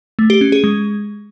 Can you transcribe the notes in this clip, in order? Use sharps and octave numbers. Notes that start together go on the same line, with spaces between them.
A3
G4
C#4
G#4
G#3